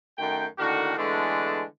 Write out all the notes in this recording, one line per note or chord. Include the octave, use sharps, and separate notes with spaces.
F#2 D#3 A3 G5
A2 D3 D#3 A#3 F#4
D3 E3 G#3 A3 B3 D4